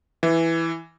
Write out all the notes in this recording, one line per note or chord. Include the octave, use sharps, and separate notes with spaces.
E3